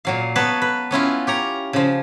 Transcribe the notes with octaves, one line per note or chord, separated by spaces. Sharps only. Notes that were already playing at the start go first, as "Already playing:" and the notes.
A#2 F#3 F5
B3 B4 C#5 A5
B4
B3 C#4 E4 F4
G4 C#5 A#5
C#3 F3